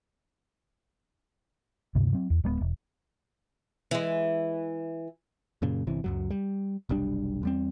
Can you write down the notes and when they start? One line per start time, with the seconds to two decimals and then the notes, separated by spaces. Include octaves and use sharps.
1.95 D2 G2 C3
2.13 F#3 C4
2.30 E2
2.44 D1 G#3 A3 B3
2.61 E1
3.91 E3 G#3
5.62 F#2 A#2 C#3
5.87 G1 C3 E3
6.04 C#2 F#2 F#3
6.31 G3
6.89 F1 B1 G3 D4
7.43 E2 G3 C4